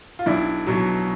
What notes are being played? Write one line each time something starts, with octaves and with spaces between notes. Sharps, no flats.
F4
B1 D4 E4
B2 F#3